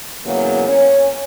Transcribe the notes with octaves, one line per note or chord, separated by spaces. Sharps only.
E2 C#3 F#3 A#3 F#4
C#4 C#5